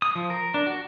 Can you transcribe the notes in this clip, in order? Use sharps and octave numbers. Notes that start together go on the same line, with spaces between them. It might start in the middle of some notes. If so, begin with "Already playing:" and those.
D#6
F3
A#4
D4
F#4